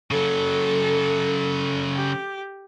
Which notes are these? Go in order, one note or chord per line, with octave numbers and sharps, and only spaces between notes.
C#3 F#3 A4
G4